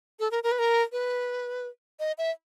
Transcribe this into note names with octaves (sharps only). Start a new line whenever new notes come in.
A4
A#4
A#4
B4
A#4
B4
D#5
E5